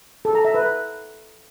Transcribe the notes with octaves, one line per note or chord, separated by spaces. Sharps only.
A4
A#5
E5
B4